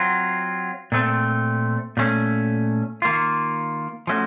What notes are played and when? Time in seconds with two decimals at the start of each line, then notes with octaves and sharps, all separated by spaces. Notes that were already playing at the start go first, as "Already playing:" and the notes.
Already playing: F#3 C4 F4
0.92 A#2 A3 C4
1.97 A#2 A3 C#4
3.02 D#3 A#3 F4
4.07 F3 A3 C#4 F#4